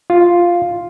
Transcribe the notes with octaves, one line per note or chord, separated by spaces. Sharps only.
F4